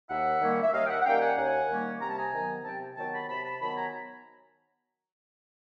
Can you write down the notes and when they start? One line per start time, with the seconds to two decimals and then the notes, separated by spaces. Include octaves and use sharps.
0.09 D#2 E5 F#5
0.41 D#3 G3 A#3 C#4
0.63 E5
0.73 D#2 D#5 F5
0.86 G5
0.89 E5 F#5
1.01 F#5
1.05 D#3 G3 A#3 C#4 F5 G5
1.21 F#5 G#5
1.37 D#2 F#5 G#5
1.70 D#3 G3 A#3 C#4
2.02 C3 A#5
2.10 A5
2.18 G#5 A#5
2.33 D#3 F#3 B3
2.65 C3 G5 A5
2.97 D#3 F#3 B3 G5 A5
3.14 A5 B5
3.29 C3 A5 B5
3.45 A5 B5
3.61 D#3 F#3 B3 A5 B5
3.77 G#5 A#5